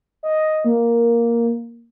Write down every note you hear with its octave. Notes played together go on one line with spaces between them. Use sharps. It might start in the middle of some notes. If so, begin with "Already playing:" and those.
D#5
A#3